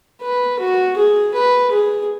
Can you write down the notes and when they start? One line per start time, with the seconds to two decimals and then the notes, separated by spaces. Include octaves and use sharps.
0.22 B4
0.59 F#4
0.97 G#4
1.34 B4
1.71 G#4